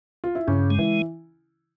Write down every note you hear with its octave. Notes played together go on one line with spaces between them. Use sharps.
F4
E4
G2 C#3 C#4
G#3
E3 E4